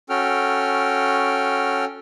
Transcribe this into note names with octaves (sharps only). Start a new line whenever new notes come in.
C#4 F#4 A4 G5 F6